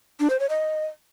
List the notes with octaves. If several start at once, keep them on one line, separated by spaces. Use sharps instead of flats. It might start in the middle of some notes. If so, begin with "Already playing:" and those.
D4
C5
C#5
D#5